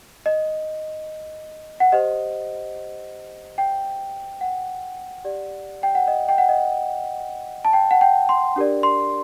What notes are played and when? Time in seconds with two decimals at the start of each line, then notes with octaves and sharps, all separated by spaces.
0.26 D#5
1.80 F#5
1.92 G4 C5 D#5
3.58 G5
4.41 F#5
5.24 G4 D5
5.83 G5
5.95 F#5
6.08 D#5
6.29 G5
6.38 F#5
6.49 D#5
7.65 A5
7.73 G5
7.91 F#5
8.01 G5
8.29 C6
8.56 D4 G4 A#4 D5
8.83 C6